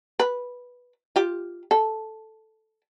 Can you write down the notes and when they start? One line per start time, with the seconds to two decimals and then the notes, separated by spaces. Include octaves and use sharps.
0.20 B4
1.16 F4 G4
1.71 A4